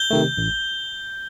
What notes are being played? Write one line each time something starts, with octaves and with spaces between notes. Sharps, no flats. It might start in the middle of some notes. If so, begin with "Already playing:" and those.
Already playing: G6 G7
C3 D#3 A3
A1